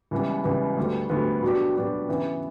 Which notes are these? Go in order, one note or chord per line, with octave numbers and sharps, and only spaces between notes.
C#2 C#3 E3 G3 B3
C#2 C#3 E3 G3 B3
D2 D3 G3 B3
D2 D3 G3 B3
B2 F#3 B3 D4 G4
B2 F#3 B3 D4 G4
C#3 E3 B3